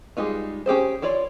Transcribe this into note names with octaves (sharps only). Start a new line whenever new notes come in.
G3 G#3 B3 D#4 F4
C#4 G4 G#4 C5
E4 F4 C#5 D5